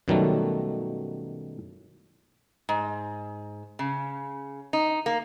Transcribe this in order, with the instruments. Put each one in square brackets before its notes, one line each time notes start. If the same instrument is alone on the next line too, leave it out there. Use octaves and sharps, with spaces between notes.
[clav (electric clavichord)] F#2 B2 D#3 F#3 G3 A3
[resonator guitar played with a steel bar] G#2
C#3
D#4
A#3